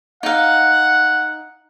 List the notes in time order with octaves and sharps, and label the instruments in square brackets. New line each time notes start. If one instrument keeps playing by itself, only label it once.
[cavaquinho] D#4 F5 [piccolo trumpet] F#5